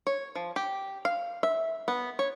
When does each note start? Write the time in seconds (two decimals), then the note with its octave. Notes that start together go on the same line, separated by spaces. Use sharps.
0.07 C#5
0.35 F3
0.56 G4
1.05 F5
1.43 E5
1.88 B3
2.19 C#5